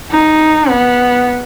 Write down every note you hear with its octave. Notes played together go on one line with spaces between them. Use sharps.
D#4
B3